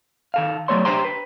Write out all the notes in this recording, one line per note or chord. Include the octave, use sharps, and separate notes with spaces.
D#3 A4 F5
F#3 G3 A3 B3 C#5 C6
D4 G4 C5 G5 A#5 C6
B4